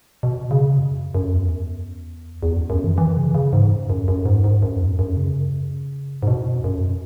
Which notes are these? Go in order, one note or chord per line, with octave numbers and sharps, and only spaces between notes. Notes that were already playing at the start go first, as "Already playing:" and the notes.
B2
C#3
F#2
F#2
E2
E2
F#2
F#2
E3
E3
C#3
C#3
G#2
F#2
F#2
F#2
G#2
G#2
F#2
E2
G#2
F#2
C#3
G#2
B2
F#2
F#2